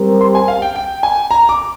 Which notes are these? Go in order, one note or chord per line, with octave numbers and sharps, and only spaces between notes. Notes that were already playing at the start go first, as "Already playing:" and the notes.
Already playing: G3 C4 G4 A#4
C6
G#5
F5
G5
G5
G#5
A#5
D6